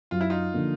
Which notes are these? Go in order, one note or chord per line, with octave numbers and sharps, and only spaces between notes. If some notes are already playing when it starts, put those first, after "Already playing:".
F#2 F4
E4
D#4 F4
D3 F3 A#3